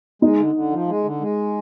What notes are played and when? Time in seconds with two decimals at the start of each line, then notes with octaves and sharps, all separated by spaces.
0.22 G#3 D#4
0.38 D3
0.55 D3
0.71 F3
0.88 G#3
1.04 D3
1.21 G#3